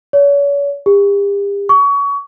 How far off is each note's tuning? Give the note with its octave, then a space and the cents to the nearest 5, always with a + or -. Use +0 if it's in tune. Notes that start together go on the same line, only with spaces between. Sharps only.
C#5 +40
G4 +40
C#6 +30